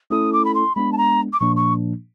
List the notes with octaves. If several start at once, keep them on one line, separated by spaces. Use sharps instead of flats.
A3 C#4 E4 A4 D#6
D6
B5
C6
G#3 B3 D4 B5
A5
A#5
D6
A#2 F3 A#3 D4 C#6
C#6